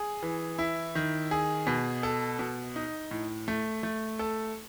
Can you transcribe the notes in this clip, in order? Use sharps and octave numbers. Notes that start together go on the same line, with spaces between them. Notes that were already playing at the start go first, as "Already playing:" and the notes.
Already playing: G#4
E3
E4
D#3
G#4
B2
A4
B2
D#4
A2
A3
A3
A4